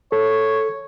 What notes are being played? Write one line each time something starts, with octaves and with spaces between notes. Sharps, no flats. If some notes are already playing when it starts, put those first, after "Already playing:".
A4 C#5